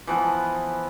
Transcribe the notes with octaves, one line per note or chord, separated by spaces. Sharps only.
E3 F3 B3